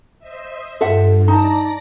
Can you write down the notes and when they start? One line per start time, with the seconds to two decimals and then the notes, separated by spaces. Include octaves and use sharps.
0.19 C5 D#5 E5
0.81 G2 F4 A4 E5 F#5
1.28 D#4 D5 A5 A#5 A#6